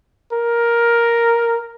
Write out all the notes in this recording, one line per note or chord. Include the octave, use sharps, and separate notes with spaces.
A#4